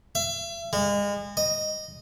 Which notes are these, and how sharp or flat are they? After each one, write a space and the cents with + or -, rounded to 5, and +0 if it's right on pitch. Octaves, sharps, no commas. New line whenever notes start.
E5 +40
G#3 -35
D#5 -5